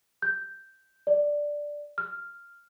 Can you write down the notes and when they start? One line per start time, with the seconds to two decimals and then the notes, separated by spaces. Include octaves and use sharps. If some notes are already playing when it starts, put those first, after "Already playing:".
0.22 G6
1.07 D5
1.98 F6